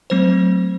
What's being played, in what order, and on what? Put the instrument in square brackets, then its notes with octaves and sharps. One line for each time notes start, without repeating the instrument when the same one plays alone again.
[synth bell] F#3 A3 C4 C5